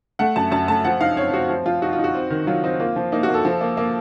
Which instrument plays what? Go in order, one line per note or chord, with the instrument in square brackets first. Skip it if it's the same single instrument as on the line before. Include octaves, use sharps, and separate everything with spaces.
[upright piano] A3 F#5
F#2 A5
F#2 A5
A3 A5
F3 F#5
D#4 F5
C4 C#5
C4 F#4
F3
F3 F4
D#4 F#4
F4
D#4
F#4
C4
D#3
F#3 F4
C4 D#4
A#3 F4
F3
A#3 D#4
F#4
A#3
A4
F3
A#3
A#3